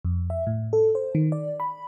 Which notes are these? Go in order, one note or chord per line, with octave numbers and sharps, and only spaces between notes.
F2
E5
A2
A4
C5
D#3
D5
B5